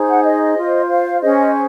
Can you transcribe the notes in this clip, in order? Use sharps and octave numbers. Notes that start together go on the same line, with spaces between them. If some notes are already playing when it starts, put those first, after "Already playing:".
Already playing: D#4 G#4 C5
F#5
D#5
F4 C5
F5
C#4 G#4 C5 D#5